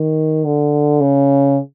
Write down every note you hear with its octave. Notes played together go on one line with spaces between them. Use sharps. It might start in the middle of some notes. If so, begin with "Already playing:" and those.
Already playing: D#3
D3
C#3